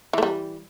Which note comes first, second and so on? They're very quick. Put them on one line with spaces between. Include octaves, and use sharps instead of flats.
E3 A3 G3